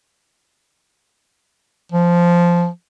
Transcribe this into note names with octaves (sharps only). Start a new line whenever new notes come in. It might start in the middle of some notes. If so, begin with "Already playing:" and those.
F3